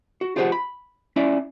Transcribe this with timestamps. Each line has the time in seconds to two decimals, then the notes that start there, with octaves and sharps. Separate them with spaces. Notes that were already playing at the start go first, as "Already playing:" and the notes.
0.21 F#4
0.36 F4 G4 G#4 C5 E5 F#5
0.52 B5
1.16 C#4 E4 D5 E5